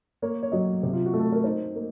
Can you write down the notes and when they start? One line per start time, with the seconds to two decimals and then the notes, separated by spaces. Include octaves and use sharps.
0.22 A#3 C#5
0.43 C#5
0.52 F#3 D#5
0.83 C3
0.93 F4
1.06 F#4
1.14 A3
1.19 A4
1.32 A#4
1.44 D#4 C5
1.76 A#3